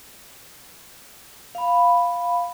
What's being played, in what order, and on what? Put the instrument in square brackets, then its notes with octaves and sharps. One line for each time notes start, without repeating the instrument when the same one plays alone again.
[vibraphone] F5 B5